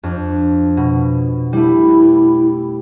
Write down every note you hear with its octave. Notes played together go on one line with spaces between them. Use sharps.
F2 D4
B2
G3 A3 E4